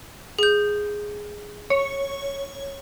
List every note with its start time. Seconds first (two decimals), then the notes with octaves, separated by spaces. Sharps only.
0.39 G#4 G6
1.70 C#5